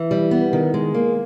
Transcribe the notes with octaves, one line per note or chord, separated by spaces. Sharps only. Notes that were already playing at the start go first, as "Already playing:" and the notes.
Already playing: E3
G3
B3
D#3
G#3
A#3